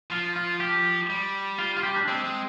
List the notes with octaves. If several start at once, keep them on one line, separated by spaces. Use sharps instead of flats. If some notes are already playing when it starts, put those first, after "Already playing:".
F3 F4
F4
G4
G3
F4
F4
G4
D4
G#3 C4
G#3